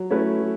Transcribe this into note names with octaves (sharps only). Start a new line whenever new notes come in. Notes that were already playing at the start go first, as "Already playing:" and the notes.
Already playing: F#3
A3 C#4 E4 B4
F#3